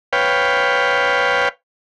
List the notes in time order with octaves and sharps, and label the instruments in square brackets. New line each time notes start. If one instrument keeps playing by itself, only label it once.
[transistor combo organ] B4 C#5 F5 G5